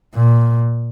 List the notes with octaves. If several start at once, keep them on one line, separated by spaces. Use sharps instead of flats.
A#2